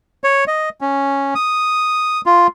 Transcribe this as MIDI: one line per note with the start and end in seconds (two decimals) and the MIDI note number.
0.24 0.44 73
0.48 0.69 75
0.81 1.34 61
1.35 2.21 87
2.26 2.47 65